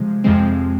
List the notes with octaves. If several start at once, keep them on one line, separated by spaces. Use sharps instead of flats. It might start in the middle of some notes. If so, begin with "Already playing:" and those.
Already playing: C3 F3 G#3
F2 C3 F3 G#3 C4